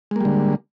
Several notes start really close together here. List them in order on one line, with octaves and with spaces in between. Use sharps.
G#3 A#3 G3 D3